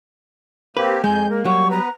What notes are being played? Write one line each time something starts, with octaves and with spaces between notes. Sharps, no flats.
A#3 C4 G4 B4
F2 G#3 G#5 G6
A#3 A#4
F#3 G3 C#6
B3 B4 A#5